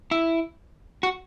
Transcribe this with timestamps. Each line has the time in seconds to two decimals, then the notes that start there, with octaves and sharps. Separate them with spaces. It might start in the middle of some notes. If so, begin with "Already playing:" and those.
0.11 E4
1.03 F#4